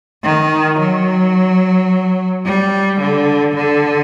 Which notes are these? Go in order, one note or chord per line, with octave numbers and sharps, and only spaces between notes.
D#3
F#3
G3
D3
D3